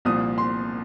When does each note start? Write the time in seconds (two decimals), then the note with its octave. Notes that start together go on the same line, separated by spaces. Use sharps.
0.05 C2 A#2 F3 D#6
0.38 C6